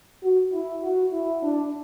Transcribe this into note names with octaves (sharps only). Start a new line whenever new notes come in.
F#4
E4
F#4
E4
D4